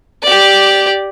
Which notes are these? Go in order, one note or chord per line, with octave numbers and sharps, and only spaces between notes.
G4 D5